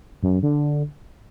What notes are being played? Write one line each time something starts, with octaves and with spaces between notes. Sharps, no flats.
F#2
F#2
D3